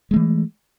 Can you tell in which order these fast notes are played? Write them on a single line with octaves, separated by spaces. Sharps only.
G#3 A3 E3